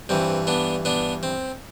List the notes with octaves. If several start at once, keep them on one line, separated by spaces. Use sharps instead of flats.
G2 E3 C4
B3 D4
B3 D4
C4